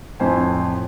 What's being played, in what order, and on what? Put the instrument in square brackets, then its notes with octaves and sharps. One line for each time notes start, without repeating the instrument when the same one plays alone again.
[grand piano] F2 A2 C5 G#5